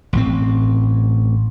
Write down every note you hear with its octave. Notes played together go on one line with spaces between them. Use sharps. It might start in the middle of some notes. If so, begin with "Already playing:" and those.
A1 A2 C4